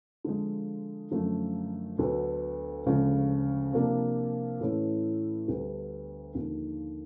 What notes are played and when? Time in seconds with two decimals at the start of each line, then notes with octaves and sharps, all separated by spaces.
0.25 D3 F3 G#3
1.11 F#2 D3 F3 A3
1.99 D2 D3 F#3 B3
2.86 D2 C#3 F3 G#3
3.73 C3 F3 A#3 D4
4.60 A2 E3 A3 C#4 E4
5.48 D2 D3 G3 B3
6.35 D#2 D3 F3